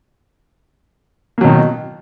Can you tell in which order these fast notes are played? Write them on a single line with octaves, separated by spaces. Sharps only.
A#3 F#3 B2 D#3